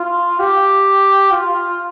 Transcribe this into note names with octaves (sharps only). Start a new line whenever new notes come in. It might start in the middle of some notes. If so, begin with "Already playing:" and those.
Already playing: F4
G4
F4